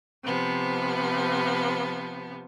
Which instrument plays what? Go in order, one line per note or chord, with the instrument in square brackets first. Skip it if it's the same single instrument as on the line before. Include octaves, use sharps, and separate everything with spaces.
[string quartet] C3 F3 B3